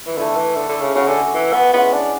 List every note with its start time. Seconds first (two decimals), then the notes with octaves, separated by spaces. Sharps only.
0.06 E3
0.17 D3 A3 E4 B4
0.36 E3
0.56 D3
0.69 D3
0.82 C#3
0.95 C#3 C#4 F#4 C#5 E5
1.08 D3
1.34 E3
1.54 B3
1.74 G#3 B3 C#4 E4
1.93 D4